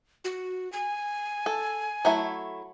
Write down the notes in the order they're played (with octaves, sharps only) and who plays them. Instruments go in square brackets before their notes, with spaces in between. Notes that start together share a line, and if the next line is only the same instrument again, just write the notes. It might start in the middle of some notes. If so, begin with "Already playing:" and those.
[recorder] F#4
G#5
[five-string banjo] A4
F#3 A3 E4